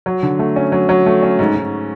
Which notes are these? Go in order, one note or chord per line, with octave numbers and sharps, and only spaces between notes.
F#3
D3
A3
C#4
F#3
F#3
A3
C#4
G#2
G#2